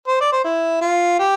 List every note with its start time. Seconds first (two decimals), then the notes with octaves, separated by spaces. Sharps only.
0.08 C5
0.21 D5
0.32 C5
0.45 E4
0.81 F4
1.19 G4